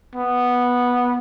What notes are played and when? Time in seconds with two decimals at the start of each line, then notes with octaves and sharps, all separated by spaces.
0.15 B3